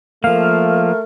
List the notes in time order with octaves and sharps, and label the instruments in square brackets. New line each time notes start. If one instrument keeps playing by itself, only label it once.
[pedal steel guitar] F3 A#3 [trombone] A3 [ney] A#4 [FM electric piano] F5